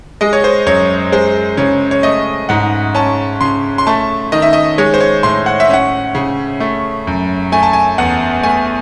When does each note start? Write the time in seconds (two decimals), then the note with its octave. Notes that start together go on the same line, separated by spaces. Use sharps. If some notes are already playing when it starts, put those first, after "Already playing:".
0.21 G#3 D#5
0.33 C#5
0.44 C5
0.67 F#2 C#5
1.12 G#3 C5
1.57 C#3 C#5
1.91 C#5
2.03 A3 D#5
2.49 G#2 F#5
2.95 C#4 A5
3.41 C#3 C6
3.78 C6
3.87 A3 A5
4.32 D#3 D#5
4.42 E5
4.53 D#5
4.78 G#3 C#5
4.94 C5
5.01 C#5
5.23 A2 C6
5.46 F#5
5.60 E5
5.70 C#4 F#5
6.15 C#3
6.60 A3
7.07 F#2
7.52 A3 G#5
7.63 A5
7.73 G#5
7.98 E2 F#5
8.43 A3 G#5